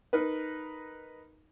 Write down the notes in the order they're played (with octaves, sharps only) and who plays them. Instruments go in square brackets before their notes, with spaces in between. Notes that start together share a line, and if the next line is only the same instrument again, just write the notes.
[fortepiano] D#4 A#4 B4